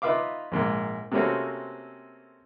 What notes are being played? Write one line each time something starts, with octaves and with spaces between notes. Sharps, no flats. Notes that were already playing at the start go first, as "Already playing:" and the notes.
D#4 F4 B4 E5 F5 D6
A#1 G#2 A#3
C3 A3 A#3 C4 C#4 F#4